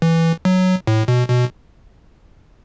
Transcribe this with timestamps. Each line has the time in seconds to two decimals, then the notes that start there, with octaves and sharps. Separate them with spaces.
0.02 E3
0.45 F#3
0.87 A2
1.08 B2
1.30 B2